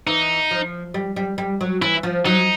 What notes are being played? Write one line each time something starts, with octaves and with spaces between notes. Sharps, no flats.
E3 D#4
F3
G3
G3
G3
F#3
E3 E4
F3
F#3 D#4